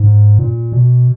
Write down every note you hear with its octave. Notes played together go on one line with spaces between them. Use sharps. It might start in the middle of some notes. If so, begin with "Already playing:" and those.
Already playing: G#2
A#2
B2